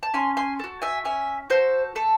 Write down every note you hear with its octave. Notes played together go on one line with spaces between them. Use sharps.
A5
C#4 G#5 C6
G#5 C6
F#4 A4
E5 G#5
C#4 E5 G#5
F#4 A4 C5
A3 A4